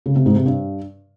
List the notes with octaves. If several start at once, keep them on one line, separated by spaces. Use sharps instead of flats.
C#3
C3
G#2
C3
G2